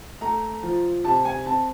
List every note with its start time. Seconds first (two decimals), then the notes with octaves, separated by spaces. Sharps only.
0.21 A3 A#5
0.63 F3
1.04 C3 A5
1.25 G#5
1.46 C4 A5